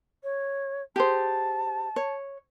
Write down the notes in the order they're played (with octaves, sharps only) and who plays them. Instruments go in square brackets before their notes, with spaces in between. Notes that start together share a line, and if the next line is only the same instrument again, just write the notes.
[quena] C#5
[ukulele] G4 G#4 C5 [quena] A5
[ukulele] C#5